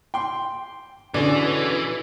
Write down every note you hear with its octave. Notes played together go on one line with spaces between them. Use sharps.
G5 C6
B2 D3 E3 C#4 G#4 D5